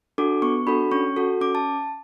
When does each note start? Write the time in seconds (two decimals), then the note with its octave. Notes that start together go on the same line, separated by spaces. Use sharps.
0.18 D4 F#4 A4 D6
0.42 B3 C#6
0.67 D4 F#4 A4 B5
0.91 C#4 C#6
1.16 F#4 A4
1.41 C#4 D6
1.55 A5